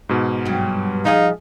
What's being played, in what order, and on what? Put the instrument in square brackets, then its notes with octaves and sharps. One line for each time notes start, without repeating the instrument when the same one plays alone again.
[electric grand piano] G#2 B2
[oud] G2 F#3
[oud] F3 G#4 D#5 [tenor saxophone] D#4 [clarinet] F5